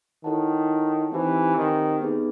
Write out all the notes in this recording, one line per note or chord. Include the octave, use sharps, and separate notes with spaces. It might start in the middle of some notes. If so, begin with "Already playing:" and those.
D#3 E4 A4 C#5 F#5 A5
E3 C4 D#4 G4 C5 E5
D#3
B3 D#4 G#4 B4